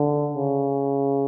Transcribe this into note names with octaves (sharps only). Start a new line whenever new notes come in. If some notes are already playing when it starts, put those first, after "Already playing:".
Already playing: D3
C#3